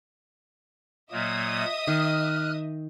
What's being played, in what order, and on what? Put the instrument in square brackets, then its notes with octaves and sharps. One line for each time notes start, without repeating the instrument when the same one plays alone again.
[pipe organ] A#2 F#3 A#3 [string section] D#5 E5 D#6
[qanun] D#3 [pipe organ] F6 F#6